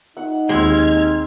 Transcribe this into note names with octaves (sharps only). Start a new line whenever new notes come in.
D#4 F#5
D#2 G#3 C4 G4 F6 G#6